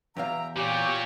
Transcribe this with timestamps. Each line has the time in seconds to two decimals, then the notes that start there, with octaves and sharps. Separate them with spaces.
0.17 E2 B2 E5 F5 G5 A#5
0.57 A#2 G4 C#5 G5